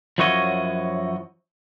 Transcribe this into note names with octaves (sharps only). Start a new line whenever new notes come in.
F#2 F3 E4 F#4 C#5 D#5